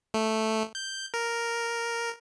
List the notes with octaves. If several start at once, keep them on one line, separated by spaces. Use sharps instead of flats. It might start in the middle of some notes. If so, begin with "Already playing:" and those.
A3
G6
A#4